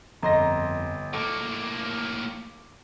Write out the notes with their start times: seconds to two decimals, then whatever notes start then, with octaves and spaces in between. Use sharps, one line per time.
0.23 G1 F2 D#5 A#5 C6 A#6
1.14 A2 A#3 A4 C#6 D6